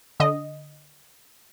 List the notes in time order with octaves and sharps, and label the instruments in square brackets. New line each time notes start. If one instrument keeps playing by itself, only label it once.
[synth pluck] D3 D#5